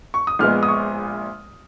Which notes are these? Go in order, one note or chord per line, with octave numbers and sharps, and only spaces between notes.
C#6
D#6
A#1 A#2 G#3 B3 F6
D#6
C#6